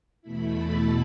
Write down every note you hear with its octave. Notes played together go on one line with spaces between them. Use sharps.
E2 B2 A3 E4 B5
A5